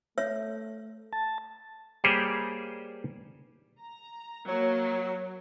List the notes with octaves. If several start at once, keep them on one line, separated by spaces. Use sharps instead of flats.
A3 C#5 E5 E6
A5
G3 A#3 G4 G#4 C5 C#5
A#5
F#3 A#3 C#5